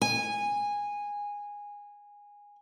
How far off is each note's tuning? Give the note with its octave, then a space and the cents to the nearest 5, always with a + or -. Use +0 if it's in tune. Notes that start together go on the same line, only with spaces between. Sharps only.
G#5 -15